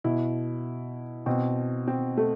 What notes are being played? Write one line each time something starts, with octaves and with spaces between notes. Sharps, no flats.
B2 E4
B2 C4
C4
A3